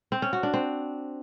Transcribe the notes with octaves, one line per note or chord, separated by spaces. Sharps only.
C4
C#4
F#4
D4
C4